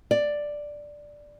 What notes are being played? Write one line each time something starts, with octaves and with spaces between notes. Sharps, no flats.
D5